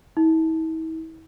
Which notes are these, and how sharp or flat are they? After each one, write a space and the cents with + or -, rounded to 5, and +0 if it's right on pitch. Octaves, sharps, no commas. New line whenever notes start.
E4 -45